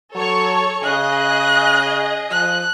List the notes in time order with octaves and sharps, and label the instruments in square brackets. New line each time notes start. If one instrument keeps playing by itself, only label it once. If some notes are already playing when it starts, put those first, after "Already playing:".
[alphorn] F#3 [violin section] A4 C#5 C#6
[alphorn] C#3 [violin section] G#4 D#5 [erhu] F#6
[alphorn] F3 [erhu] F#6